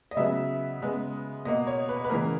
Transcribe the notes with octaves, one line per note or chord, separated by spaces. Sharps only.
D#5
C#3 F#3 B3 E5
C#3 G#3 B3
B2 A#3 D#5
C#5
B4
B4
C#3 E3 A#3 A#4